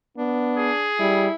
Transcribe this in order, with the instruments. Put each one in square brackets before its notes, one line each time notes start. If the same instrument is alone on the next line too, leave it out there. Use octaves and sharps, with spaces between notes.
[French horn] B3 [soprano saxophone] D4
[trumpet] G#4
[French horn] G3 [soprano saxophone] E4